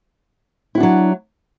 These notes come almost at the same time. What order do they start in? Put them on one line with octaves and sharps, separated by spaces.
E4 F#4 D4 F#3